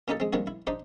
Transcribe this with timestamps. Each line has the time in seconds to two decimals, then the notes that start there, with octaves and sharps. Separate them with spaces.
0.08 A#2 C#4 D#4 G4 A4
0.20 G#3 C4
0.33 A#2 D#3 G3 C4 D4 F#4
0.47 E4
0.67 D4 D#4 G4 C5